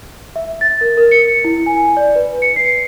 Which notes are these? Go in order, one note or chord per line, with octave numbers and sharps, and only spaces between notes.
E5
A6
A#4
A#4
C#7
E4
G#5
D5
B4
C#7
C7